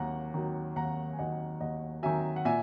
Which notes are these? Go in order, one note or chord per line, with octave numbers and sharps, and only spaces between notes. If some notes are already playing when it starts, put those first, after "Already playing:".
Already playing: D#2 D#3 F#3 F#5 A#5
D#3 F#3
D#2 F#5 A#5
G#5
D#3 F#3 D#5 F#5
D#2 D#5 F#5
D#3 F#3 E5 G#5
F#5
A#2 E5 G#5